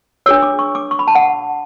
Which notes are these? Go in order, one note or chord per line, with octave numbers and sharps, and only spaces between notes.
D4 G#4 C#5 E6
D6
C#6
D6
C#6
B5
A5
F#5